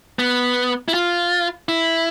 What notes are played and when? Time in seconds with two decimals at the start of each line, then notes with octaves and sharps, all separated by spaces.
0.19 B3
0.88 E4
0.94 F4
1.69 E4